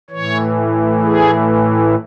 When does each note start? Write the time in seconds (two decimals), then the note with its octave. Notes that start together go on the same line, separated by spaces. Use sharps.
0.10 E3 C#5
0.16 A2
1.03 G#4